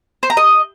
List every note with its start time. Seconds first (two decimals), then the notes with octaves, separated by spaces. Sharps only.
0.23 C5
0.30 A#5
0.37 D#5